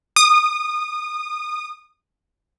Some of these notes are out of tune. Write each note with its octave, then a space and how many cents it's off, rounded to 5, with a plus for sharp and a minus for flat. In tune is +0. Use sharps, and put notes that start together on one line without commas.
D#6 -25